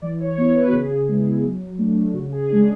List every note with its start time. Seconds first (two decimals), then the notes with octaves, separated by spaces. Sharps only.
0.02 E3 D5
0.20 C#5
0.38 B3 C#5
0.41 E4
0.55 B4
0.67 F#4
0.72 C#3 G#4
1.08 G#3 B3 E4
1.43 F#3
1.78 A3 D4
2.14 C#3 F#4
2.32 G#4
2.49 D4 G#4
2.52 G#3